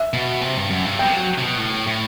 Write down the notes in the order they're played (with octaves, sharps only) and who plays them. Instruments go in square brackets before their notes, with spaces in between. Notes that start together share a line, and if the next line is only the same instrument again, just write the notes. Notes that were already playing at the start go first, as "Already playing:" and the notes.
Already playing: [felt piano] E5
[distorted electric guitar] B2
C3
G2
F#2
G2
[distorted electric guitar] B2 [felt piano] G5
[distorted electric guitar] F#3
C3
B2
A2
A2